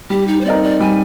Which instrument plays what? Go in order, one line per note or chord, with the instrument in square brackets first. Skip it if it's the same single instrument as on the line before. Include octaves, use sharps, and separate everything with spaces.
[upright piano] G3 [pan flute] G4
[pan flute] D#4
C5
[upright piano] C4 D#4 A#4 [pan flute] D5
[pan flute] D5
[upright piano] G3 [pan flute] G#5